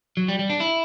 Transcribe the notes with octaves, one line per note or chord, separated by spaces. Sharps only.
F#3
G3
G3
D4
E4